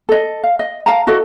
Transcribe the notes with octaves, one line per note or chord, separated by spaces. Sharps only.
A4 D#5
F5
D#5
F5 A5 A#5
E4 F#4 A4 D#5